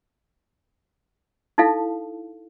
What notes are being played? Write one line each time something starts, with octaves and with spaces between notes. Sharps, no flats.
D#4 E4 A4 F5